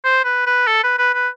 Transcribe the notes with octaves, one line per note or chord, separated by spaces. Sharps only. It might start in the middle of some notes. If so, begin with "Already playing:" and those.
C5
B4
B4
A4
B4
B4
B4